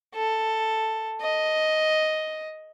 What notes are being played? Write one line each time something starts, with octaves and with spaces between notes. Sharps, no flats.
A4
D#5